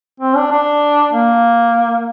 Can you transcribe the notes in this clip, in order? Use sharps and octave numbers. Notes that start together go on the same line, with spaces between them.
C4
D4
D4
A#3